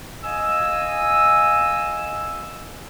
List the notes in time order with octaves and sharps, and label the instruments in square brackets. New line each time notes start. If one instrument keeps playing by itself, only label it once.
[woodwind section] D#5 F5 G#5 E6